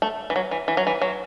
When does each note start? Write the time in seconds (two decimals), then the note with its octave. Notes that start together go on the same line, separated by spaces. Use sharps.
0.02 A3
0.30 E3
0.36 F#3
0.51 E3
0.68 E3
0.77 F#3
0.87 E3
1.02 F#3